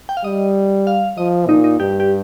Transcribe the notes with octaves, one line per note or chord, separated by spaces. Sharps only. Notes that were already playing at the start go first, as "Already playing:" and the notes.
G5
F5
G3 D#5
F5
F3 D#5
A#2 D#4
D#4
G2 G4
G4